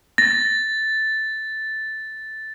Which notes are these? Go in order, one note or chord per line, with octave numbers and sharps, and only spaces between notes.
A6 A#6